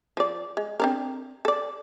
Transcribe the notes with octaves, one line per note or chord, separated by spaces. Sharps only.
F3 D5
G#3
C4 D4 A#4
A4 D5